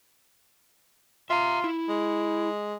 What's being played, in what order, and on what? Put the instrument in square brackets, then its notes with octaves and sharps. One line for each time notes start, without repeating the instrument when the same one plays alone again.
[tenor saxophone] F4 [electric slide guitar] E5 A#5
[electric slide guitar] E4
[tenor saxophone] G#3